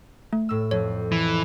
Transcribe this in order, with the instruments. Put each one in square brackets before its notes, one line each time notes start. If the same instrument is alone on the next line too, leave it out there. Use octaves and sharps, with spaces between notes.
[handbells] A3
[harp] A2 E6
[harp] F2 [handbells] C#5
[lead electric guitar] E3